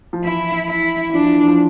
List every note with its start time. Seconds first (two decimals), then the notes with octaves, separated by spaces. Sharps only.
0.13 F3
0.24 E3 E4
0.69 E4
1.10 E3
1.14 F3 D4
1.25 E3
1.36 E3
1.48 F3